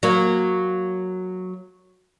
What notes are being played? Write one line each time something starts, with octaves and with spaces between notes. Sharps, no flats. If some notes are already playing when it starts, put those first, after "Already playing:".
F#3 A#3